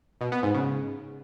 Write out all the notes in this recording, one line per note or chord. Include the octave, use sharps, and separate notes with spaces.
B2
B3
G#2
C#3